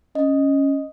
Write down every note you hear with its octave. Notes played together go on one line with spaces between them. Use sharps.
C#4 D#5